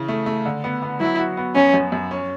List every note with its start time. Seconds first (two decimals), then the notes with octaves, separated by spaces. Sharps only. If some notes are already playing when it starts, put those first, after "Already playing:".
Already playing: C#3 E3
0.08 A3
0.26 A3
0.46 D3
0.64 B3
0.82 B3
1.00 F#3 E4
1.19 F#4
1.37 B3
1.55 F#2 C#4
1.74 F#2
1.92 F#2
2.11 C#4